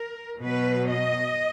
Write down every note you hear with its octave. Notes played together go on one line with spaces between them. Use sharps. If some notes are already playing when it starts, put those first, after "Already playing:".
Already playing: A#4
B2 F#3 B4
D#5